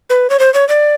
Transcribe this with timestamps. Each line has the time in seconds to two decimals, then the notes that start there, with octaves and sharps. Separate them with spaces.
0.10 B4
0.30 C#5
0.39 C5
0.54 C#5
0.69 D5